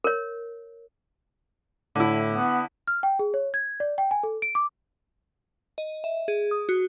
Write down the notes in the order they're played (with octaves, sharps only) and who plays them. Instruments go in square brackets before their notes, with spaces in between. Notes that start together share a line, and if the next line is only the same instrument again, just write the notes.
[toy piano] A#4 C#5
[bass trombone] A2 [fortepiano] D3 E4
[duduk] B3
[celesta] F6
G5
G#4
C#5
G#6
D5
G5
G#5
A4
D7
D6
[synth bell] D#5
E5
G#4
D#6
F#4